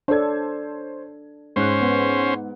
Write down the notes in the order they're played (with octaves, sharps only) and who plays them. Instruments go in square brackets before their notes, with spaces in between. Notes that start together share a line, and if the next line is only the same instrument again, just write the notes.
[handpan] D4 A4 [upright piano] C5 C#5 G#6
[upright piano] G#2 F#6 [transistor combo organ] C#4 C5
[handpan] B3